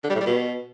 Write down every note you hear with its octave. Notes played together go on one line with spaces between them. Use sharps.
D3
G3
A2
G3
B2